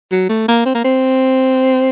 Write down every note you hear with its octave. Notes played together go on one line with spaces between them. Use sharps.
F#3
A3
A#3
C4
A#3
C4